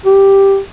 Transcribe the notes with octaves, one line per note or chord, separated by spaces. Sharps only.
G4